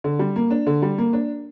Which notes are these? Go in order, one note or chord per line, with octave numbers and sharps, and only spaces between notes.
D3
G3
A#3
D4
D3
G3
A#3
D4